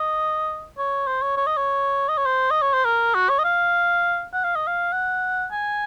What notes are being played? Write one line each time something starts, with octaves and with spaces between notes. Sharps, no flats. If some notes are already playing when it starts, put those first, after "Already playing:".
Already playing: D#5
C#5
C5
C#5
C#5
D#5
C#5
D#5
C#5
C5
D#5
C#5
C5
A#4
F#4
C#5
D#5
F5
F#5
F5
D#5
F5
F#5
G#5